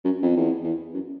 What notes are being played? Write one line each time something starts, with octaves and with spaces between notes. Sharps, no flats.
F#2
F2
E2
E2
F#2